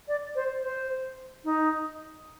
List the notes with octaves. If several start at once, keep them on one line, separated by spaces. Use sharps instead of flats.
D5
C5
C5
D#4